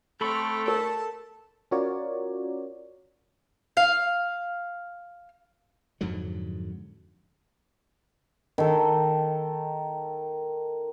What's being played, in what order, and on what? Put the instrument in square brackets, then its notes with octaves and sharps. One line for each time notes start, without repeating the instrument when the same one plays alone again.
[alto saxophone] A3 [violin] C4 F6 [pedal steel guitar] A4 B5 C#6
[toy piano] A#4 [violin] A5 E7
[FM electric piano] C#4 F4 F#4 A#4 C#5 D5
[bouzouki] F5
[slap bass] F2 G#2 D3 F#3
[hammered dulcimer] D#3 A4